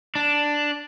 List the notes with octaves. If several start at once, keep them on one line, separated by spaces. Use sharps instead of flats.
D4